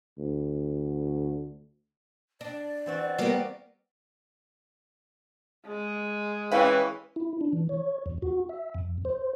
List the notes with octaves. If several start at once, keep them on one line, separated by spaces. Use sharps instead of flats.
D2
D4 D5
E3 C4 F#4
G3 A#3 B3 G4 A#4 F5
G#3
E3 C#4 B4 F5 G5 C#6
E4
D4
E3
C#5
E2
F#4
E5
F2
C5